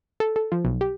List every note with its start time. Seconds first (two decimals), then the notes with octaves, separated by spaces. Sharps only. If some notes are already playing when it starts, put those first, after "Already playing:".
0.20 A4
0.36 A4
0.52 F3
0.65 B1
0.81 G4